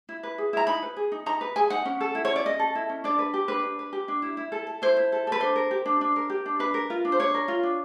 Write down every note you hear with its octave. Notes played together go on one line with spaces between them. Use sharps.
E4
B4
G#4
E4 A#5
D#4 B5
B4
G#4
D#4
D#4 A#5
B4
G#4 G#5
D#4 F#5
C#4
A4
E4
C#5
C#4
D5
C#4 D#5
A4
E4
C#4
D4 D5
B4
G4
D4 B4
D4
B4
G4
D4
E4
E4
A4
A4
E4 C5
E4
A4
A4 B4
D4 C5
A#4
G4
D4
D4
A#4
G4
D4
D4 B4
A#4
F4
D4
C5
D4 C#5
A#4
F4
D4